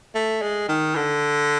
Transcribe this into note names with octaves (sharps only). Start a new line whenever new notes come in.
A3
G#3
D#3
D3